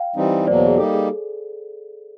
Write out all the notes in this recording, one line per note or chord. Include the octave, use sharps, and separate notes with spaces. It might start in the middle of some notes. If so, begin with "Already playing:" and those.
Already playing: F5 G5
E3 G3 C4 D#4
E2 B2 F#3 A#3 C5 D5
C5 D5
G#4
G3 A#3 D#4 G4 A4
G#4